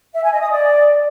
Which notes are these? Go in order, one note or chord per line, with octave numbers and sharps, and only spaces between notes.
E5
G#5
D#5
D#6
D5